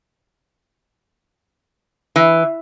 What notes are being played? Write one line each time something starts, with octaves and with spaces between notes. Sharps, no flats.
E3